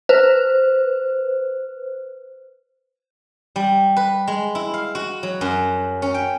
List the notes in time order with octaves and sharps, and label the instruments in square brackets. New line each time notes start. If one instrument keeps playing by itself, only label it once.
[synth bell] B4 C5
[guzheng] G3
B4
G#3
E4
F5
F#4
F#3
F#2
C#4
G5